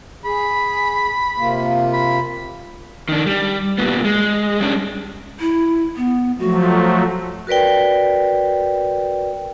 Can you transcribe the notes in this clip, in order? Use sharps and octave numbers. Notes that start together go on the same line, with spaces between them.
G#4 B5
C3 A#3 F4
B5
D#3 D4
G3
A#2 G3 B3
G#3
G3 C#4 D4
E4
B3
F3 F#3 A3 F#4
F#4 A#4 B4 D5 G5